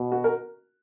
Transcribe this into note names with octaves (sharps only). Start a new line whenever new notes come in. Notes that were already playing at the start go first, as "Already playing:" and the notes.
Already playing: B2
F#4
A#4